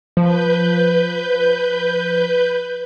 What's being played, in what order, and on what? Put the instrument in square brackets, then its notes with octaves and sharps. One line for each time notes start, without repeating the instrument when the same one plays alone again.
[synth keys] F3 [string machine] B4 G6